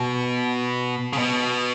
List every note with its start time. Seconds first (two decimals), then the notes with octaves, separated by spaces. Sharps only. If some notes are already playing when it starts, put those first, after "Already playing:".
Already playing: B2
1.13 C#3
1.17 B2